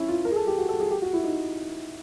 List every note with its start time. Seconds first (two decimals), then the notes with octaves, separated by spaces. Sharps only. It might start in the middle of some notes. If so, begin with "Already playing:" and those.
Already playing: C#4 E4
0.08 F4
0.25 A#4
0.31 G#4
0.36 A4
0.47 G4
0.58 F#4
0.69 A4
0.80 G#4
0.91 G4
1.02 F#4
1.13 E4
1.24 D#4